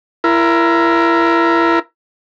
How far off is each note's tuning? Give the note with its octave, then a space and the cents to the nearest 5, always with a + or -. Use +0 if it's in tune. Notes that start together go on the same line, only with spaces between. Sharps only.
E4 +30 A#4 +10